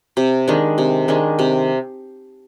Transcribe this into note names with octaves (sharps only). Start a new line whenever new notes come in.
C3
D#3 G#3 D4
C3
D#3 G#3 D4
C3